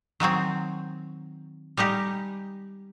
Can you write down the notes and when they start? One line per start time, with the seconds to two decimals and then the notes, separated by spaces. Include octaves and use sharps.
0.20 D#3 F#3 G#3 C4
1.77 G3 G#3 D#4 G4